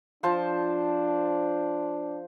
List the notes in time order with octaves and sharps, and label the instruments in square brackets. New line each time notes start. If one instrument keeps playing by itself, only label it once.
[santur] F3 C5 A5 [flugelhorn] D4